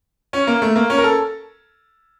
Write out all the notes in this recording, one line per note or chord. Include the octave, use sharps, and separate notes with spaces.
C#4
A#3
A3
A#3
C#4
A#4
A4